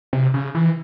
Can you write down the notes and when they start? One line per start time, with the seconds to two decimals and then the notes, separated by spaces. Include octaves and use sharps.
0.13 C3
0.34 C#3
0.55 E3